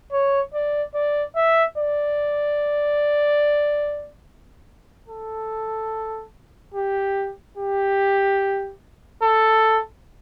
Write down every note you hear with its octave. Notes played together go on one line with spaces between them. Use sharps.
C#5
D5
D5
E5
D5
A4
G4
G4
A4